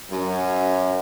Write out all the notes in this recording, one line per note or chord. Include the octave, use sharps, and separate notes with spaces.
F#2